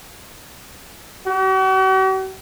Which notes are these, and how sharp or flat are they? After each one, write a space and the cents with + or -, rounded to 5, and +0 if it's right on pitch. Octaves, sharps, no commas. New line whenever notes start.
F#4 +45